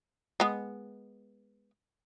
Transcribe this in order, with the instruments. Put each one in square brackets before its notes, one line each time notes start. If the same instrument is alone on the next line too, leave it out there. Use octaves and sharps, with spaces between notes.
[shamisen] G#3 B3